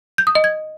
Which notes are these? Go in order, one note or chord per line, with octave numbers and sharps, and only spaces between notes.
G6
D#6
D#5
G#6